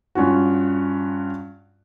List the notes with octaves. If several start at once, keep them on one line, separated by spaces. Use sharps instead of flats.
G2 C#4 F4 F#4